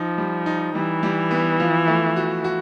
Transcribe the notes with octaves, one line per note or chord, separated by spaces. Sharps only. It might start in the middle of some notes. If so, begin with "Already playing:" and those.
Already playing: F3 D#4
G3
D#4
E3 G3
G3
B3
F3
A3
F#4
F#4